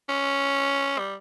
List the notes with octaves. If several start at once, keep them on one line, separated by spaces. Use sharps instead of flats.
C#4
G3